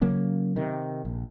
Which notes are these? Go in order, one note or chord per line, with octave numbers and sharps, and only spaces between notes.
C#3 F#3 A#3 C#4
C3 D#3
A#1